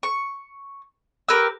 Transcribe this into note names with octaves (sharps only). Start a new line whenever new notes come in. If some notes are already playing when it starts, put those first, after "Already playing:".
C#6
G4 A#4 B4 E6